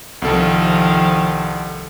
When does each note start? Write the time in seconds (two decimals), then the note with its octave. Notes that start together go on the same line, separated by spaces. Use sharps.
0.22 C2 D#3 F3 A4